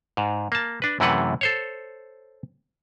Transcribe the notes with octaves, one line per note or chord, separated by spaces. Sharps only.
G#2
A#3 A5
D4 B4
F#2 C3 E3 A3 B4 F#5
A4 C5 C#5